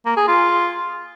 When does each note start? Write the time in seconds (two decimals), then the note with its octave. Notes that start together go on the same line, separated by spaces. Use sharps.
0.06 A#3
0.17 G#4
0.28 F4